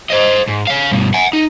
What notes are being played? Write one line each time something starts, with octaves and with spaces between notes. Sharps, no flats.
C5 D#5
G#2
C#5 F5
G2 B2
F#5 G#5
D#4